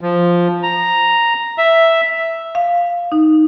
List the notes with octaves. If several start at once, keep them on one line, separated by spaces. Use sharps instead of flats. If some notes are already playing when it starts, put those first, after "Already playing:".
F3
A#5
E5
F5
D#4